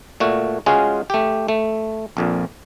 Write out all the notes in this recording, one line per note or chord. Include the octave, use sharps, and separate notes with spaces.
A#2 A3 F#4
G#3 C#4 F4 F#4 G#4
A3 G4
A3
A#1 F2 A#2